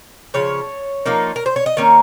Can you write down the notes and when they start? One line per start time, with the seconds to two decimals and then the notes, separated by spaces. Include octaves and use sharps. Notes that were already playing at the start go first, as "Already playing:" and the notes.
0.34 C#3 F3 C#5
1.06 F3 A#3 D#4
1.36 A#4
1.46 C5
1.56 C#5
1.66 D#5
1.77 D#3 A#3 C#4 F5